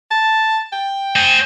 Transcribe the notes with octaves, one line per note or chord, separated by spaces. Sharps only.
A5
G5
C5 G#5